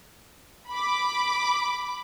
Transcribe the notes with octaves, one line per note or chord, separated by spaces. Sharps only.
B5 D6